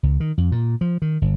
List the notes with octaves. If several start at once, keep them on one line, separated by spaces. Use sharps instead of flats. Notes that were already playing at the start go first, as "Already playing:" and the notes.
C#2
D#3
F2
A#2
F3
D#3
G1